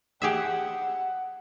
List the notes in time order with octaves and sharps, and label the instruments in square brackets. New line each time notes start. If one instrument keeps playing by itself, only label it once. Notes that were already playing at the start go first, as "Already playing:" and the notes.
[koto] G4 G#4 E5 [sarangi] F#5